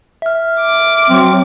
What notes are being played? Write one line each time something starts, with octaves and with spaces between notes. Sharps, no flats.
E5 F6
D6
F#3 C4